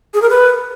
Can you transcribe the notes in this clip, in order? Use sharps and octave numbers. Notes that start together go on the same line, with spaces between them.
G#4
A#4
B4